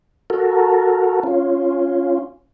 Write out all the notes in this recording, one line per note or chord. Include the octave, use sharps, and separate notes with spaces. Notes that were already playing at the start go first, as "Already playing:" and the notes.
F#4 A4 A#4
C#4 F4